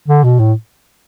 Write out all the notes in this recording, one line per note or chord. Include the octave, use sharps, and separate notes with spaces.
D3
B2
A2